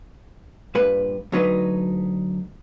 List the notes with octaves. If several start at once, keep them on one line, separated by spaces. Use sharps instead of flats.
G2 A#2 B4
D2 F#3 D#4 B4